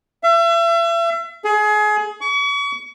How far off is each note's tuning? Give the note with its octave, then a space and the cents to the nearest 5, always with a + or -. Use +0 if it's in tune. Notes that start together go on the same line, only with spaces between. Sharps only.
E5 +40
G#4 +30
C#6 +40